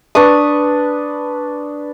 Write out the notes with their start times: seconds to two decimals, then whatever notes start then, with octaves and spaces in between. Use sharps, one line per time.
0.15 D4 B4 C#6 D#6